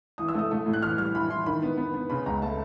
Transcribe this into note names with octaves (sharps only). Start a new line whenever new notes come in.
E3 D#6
E6
A3 D#6
A3
A2
F#6
E3 F6
G3 F6
E3 B5
E3 C6
D#3 B5
B3
B3
B3
C#3 B5
C#2 A#5
A3 A5